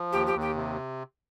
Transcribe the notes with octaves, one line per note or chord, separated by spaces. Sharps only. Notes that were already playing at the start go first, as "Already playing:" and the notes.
Already playing: F3
D#2 G4
G4
D#2
G4
C3